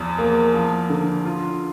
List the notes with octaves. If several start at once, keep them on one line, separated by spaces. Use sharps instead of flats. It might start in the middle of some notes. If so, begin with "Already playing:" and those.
Already playing: E2 F3
A#3
F3
D3
F4